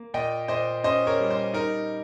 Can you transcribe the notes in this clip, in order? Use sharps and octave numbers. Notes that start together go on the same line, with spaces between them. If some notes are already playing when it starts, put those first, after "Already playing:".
Already playing: A#3
A#2 D#5 G5
A#2 C5 D#5
C#4 C5 D#5
A#4 C#5
G3
C5
D#4 A#4